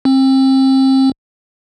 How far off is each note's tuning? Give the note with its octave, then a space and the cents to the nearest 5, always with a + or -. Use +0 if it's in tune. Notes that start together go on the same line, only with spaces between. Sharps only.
C4 +30